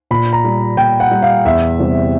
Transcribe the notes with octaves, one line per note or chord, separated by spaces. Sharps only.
A#2 B5
A#5
G3
A#2 G5
F#5
G3
F5
E2 E5
C3 E3 G3